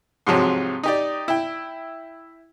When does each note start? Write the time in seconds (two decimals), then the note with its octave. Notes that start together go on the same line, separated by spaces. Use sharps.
0.27 G#2 C3 F3 F#3
0.83 D#4 G4 D5
1.28 E4 G5